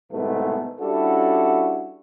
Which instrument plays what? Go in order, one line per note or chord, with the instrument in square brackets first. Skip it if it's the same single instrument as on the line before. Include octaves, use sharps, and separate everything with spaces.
[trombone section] C2 G#2 B2 D#3 A3 B3
G3 C#4 D4 E4 F#4 A4